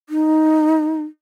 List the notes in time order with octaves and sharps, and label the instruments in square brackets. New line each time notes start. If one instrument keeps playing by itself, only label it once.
[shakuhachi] D#4